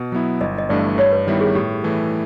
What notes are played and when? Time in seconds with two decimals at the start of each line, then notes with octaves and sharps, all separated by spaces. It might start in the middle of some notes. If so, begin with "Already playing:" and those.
Already playing: B2
0.12 F#3 B3 E4
0.41 G1 D#5
0.58 D#5
0.69 G2 E3 A3 D4 D5
0.98 G2 C#5
1.12 B4
1.27 D#3 G3 B3 E4
1.41 G#4
1.55 A2 G4
1.84 E3 A3